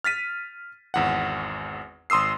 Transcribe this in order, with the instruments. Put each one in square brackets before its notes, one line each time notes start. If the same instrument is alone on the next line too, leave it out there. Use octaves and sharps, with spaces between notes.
[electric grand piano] F6 A6 B6 D#7
G#1 E2 F#5
G#1 C6 D#6 E6 C7